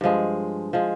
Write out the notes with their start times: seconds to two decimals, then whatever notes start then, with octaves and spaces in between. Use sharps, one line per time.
0.01 G2 F3 G#3
0.73 F3 G#3